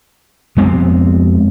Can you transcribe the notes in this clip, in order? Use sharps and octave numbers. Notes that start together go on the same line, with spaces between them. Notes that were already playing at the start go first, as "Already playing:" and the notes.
F2 G#3 B3 C4